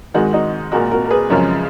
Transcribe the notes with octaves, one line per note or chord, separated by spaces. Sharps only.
G#2 D#3 G#3 D#4 F#4
D#4 F#4
A#2 G#3 F#4 A#4
F#4 A#4
A#4
G#4 B4
F#2 C#3 F3 G#3 A#4 C#5